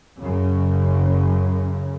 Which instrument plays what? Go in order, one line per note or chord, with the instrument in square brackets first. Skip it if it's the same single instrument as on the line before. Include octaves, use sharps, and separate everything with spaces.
[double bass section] F#2 C#3